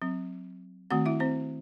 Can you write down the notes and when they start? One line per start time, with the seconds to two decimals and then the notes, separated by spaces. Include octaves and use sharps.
0.02 F#3 C4
0.91 D#3 A3 C4 F#4 F#5
1.06 E4 E5
1.20 C4 C5